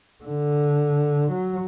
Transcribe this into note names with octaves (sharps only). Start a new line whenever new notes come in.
D3
F#3